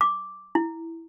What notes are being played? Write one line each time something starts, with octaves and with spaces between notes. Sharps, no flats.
D6
E4